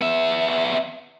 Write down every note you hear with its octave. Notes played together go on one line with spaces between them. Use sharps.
B3 E5